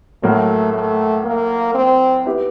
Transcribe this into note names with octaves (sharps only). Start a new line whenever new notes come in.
A2 F#3 A3 A#3
A3
A#3
C4
B3 E4 G4